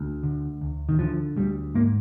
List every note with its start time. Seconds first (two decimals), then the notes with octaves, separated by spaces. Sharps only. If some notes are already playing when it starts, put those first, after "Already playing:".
Already playing: D2
0.23 D3
0.61 D2
0.89 D#3
0.99 D3 F3
1.36 D2 G3
1.75 G#2 A#3